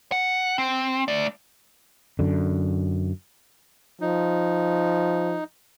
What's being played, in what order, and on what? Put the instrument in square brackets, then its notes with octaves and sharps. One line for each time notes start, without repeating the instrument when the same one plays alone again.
[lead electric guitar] F#5
C4
A3 D5
[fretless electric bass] F#2 D3
[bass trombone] F3 [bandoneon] D#4